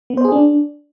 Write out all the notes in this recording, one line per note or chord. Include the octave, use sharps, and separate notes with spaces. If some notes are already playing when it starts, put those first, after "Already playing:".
B3
C5
G#4
D4